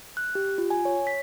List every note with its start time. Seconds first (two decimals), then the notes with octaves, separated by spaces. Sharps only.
0.17 F#6
0.35 G4
0.58 F4
0.70 G#5
0.85 C#5
1.07 B6